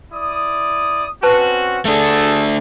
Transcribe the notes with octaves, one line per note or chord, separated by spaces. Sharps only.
E4 D5 D#6
C4 C#4 F#4 B4 C5 A5
A3 D4 G#4 A4